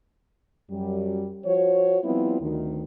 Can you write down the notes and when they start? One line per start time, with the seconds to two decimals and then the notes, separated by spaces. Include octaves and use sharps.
0.71 F#2 G3
1.45 F3 F#4 C5 C#5
2.05 F3 G3 B3 C4 E4 F4
2.41 D2 D#3